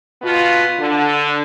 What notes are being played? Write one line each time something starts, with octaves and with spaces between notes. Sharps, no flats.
B2 B3 F4
D3